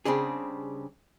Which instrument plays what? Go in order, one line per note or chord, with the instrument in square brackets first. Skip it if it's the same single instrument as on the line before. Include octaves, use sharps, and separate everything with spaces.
[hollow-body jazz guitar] C#3 G3 C4 D4 G#4